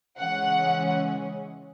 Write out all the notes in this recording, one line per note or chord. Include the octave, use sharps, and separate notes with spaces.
C#3 E3 G#3 C#4 F#5